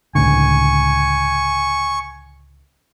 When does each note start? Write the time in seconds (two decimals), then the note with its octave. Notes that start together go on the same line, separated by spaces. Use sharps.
0.15 C#2 A2 D3 G#5 C#6